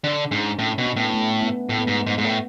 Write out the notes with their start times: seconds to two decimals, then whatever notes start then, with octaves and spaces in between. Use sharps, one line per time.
0.04 D3 D4
0.31 G#2 C#4
0.59 A2 C#4
0.78 B2
0.87 B3
0.96 A2
1.14 A3
1.42 B3
1.69 A2 A3
1.79 B3
1.87 G#2 A3
2.07 G#2
2.18 G#2
2.24 A2